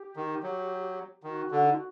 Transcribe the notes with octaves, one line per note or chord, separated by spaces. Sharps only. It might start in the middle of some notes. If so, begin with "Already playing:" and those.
Already playing: G4
D#3
F#3
D#3 F#4
D3
D#4
F#4